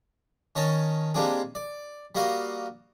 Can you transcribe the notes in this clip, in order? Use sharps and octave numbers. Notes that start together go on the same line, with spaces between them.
D#3 C#4 C#5 D#5 A5
G3 G#3 A#3 C4 D4 G#4
D5
G3 A#3 F#4 D#5 F5